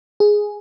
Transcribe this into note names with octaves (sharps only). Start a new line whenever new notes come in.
G#4